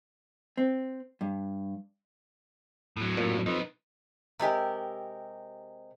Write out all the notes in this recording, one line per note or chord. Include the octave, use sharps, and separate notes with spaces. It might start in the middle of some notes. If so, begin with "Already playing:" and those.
C4
G2
A2 F#3
F#2 A#2
F2 D#4 B4
C3 G#3 G4 A#4